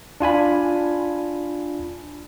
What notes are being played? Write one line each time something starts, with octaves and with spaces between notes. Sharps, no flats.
D4 F4 G#5 B5